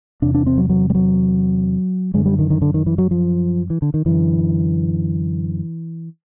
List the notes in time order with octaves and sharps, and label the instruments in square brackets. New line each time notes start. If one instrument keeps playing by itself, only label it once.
[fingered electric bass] E2 C3 D4
D4
C4
F#3
F#3
G3
F#3
F#2 D3 G#3
G3
D#3
D#3
D3
D#3
E3
F#3
F3
E3
D3
D#3
F#2 D3 E3